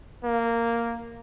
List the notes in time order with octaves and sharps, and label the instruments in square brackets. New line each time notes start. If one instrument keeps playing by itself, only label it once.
[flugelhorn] A#3